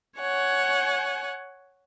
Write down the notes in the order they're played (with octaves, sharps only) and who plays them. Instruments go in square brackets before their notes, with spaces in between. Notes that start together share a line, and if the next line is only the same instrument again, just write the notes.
[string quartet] C#5 F#5 G#5